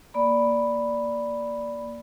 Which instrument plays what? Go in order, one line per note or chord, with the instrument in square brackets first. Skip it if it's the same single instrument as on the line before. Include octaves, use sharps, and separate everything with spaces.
[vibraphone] A#3 D5 B5